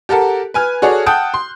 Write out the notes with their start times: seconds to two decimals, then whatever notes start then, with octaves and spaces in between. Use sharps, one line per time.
0.09 G4 A4 A#4 F#5 A5
0.54 B4 G#5 F6
0.82 F#4 G#4 A4 C#5 D5
1.06 F#5 G5 A5 D#6 F#6 G6
1.34 C6